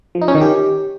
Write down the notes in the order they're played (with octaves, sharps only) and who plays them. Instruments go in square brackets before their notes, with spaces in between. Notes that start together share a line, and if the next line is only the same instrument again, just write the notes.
[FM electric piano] F3
D#4
C#4
D#3
G4